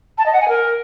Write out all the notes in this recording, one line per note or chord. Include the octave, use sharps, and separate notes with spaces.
A5
D#5
F#5
G#5
A#4